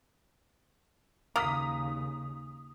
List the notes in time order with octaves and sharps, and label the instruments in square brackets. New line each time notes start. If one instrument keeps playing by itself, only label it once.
[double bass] D#2 C#3 [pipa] A#3 [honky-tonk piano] A#5 D#6 B6